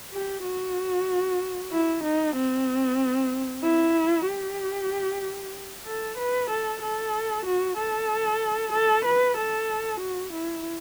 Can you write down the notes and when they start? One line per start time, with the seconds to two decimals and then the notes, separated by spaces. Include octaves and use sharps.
0.12 G4
0.44 F#4
1.72 E4
2.04 D#4
2.36 C4
3.63 E4
4.27 G4
5.87 A4
6.18 B4
6.50 A4
6.82 A4
7.46 F#4
7.78 A4
8.73 A4
9.06 B4
9.38 A4
10.01 F#4
10.33 E4